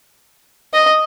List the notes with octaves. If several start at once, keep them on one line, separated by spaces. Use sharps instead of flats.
D#5